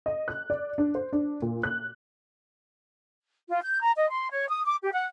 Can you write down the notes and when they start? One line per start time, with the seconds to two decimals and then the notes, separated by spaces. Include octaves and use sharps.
0.06 D#5
0.28 F#6
0.50 D5
0.78 D4
0.95 C5
1.13 D4
1.42 A#2
1.63 F#6
3.50 F4
3.62 G6
3.81 A#5
3.96 D#5
4.11 C6
4.31 C#5
4.48 D#6
4.65 D6
4.82 G4
4.93 F#5